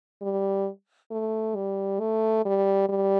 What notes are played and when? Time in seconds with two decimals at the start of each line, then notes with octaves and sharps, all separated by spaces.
0.22 G3
1.11 A3
1.55 G3
2.00 A3
2.45 G3
2.89 G3